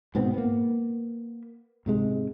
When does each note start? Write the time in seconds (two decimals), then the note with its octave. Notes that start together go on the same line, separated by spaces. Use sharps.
0.15 G#2 B2 B3 C4
0.34 A#3 B3
1.86 G#2 C3 G#3